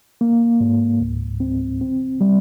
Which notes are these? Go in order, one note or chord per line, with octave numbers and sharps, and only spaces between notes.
A#3
G#2
C#2
C4
C4
G3